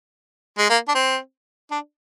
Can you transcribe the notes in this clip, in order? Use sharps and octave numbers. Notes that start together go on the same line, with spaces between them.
G#3
A#3
D4
C4
D4